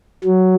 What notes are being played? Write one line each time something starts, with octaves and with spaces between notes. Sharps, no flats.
F#3